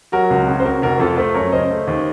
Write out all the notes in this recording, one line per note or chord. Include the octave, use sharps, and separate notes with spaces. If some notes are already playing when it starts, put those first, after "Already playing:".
F#3 F#4 A#4
C#2
C#3
C5
C#3 F#4 A#4
F1 F#4 A#4
F2 F4 A4
A3 A4 C5
F#2 A#4 C#5
C#3 C5 D#5
A3
D#2